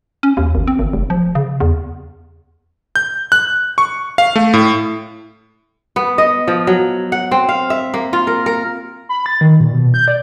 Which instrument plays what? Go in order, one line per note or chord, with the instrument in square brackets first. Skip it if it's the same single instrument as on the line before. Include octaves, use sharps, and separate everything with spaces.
[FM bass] C#4
D#2
G#1
C4
G#1
F1
F3
C#3
E2
[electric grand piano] G6
F#6
C#6
F5
A3
A2
[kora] B3
D#5
F3
F#3
F#5
C4
F5
E5
A#3
F4
A#4
A#4
[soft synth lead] B5
A6
D#3
A#2
B2
G6
D5